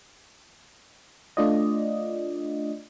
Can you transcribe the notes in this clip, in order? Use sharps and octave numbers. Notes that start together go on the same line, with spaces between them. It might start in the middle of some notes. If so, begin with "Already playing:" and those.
A3 D4 F4 D5 D#5